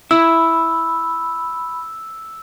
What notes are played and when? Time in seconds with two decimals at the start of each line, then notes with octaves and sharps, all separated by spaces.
0.11 E4 B5 E6